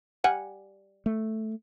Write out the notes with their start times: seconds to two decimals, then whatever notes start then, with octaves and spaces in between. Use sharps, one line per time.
0.24 G3 F#5 G#5
1.06 A3